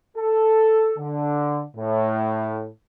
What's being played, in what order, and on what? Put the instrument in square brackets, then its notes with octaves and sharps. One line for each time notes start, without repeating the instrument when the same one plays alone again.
[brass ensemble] A4
D3
A2